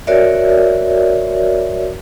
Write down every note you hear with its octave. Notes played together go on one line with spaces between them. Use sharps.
F#4 A#4 C#5 D5 E5